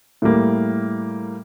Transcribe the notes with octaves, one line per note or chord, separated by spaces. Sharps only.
A2 G3 A#3